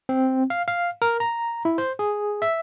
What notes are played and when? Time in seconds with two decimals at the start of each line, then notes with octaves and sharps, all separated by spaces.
0.09 C4
0.50 F5
0.68 F5
1.02 A#4
1.20 A#5
1.65 E4
1.78 C5
1.99 G#4
2.42 E5